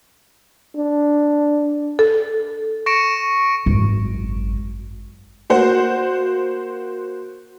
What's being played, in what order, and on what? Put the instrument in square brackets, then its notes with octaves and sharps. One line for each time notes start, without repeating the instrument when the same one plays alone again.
[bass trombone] D4
[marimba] A4
[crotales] C#6 A#6 C#7 D7 E7
[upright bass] G#1 F#2
[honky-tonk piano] A#3 F#4 C5 F#5